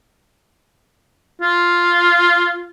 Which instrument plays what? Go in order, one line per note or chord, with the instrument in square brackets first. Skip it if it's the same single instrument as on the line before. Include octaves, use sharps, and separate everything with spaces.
[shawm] F4